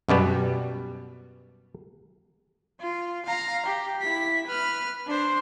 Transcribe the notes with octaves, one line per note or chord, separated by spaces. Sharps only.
F#2 B2 G3 B3
F4
F5 A#5
G4
E4 B6
B4 F6
D4 C5